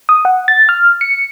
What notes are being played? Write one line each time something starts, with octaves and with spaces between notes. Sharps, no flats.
D#6
F#5
A6
F6
C#7